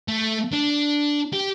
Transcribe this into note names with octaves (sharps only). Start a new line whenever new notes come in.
A3
D4
G4